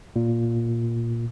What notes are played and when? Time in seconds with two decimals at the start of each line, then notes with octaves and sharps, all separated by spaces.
0.16 A#2